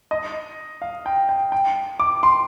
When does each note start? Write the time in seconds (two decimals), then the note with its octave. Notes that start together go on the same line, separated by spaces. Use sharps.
0.11 D#5
0.82 F5
1.06 G5
1.29 G5
1.52 G5
2.00 D6
2.23 C6